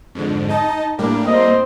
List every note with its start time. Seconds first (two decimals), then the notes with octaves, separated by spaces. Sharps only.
0.15 F2 G#2 D3
0.49 D#4 D#5 A5
0.98 A2 G3 A#3 D4 G4
1.27 C4 C5 D#5